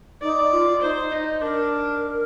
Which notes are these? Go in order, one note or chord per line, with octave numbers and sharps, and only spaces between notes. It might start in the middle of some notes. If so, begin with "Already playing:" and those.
D#4 D5
F4
D#4 C5
D#4
D4 A#4